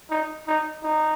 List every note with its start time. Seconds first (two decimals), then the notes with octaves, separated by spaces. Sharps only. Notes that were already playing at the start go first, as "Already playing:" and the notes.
0.10 D#4
0.47 D#4
0.83 D#4